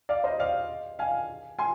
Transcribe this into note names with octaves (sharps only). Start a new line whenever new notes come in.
D5 F5
C5 D#5
D5 F5
F5 G#5
G#5 C6